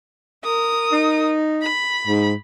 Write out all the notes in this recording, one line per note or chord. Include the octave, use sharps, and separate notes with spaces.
A#4 D#6
D#4
B5
G#2